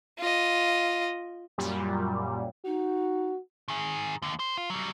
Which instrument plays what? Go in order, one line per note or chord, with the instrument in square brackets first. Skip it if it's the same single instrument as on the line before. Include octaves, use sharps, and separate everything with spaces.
[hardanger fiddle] F4 D#5
[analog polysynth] F#2 A#2 G3
[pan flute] D#4 [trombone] F#4
[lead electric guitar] D#3 G#4
D#2 D3
C5
F4
F#3 G3